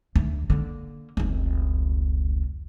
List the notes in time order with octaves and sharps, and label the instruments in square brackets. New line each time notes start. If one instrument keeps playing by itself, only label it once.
[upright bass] D2
D3 A#3
F1 C#2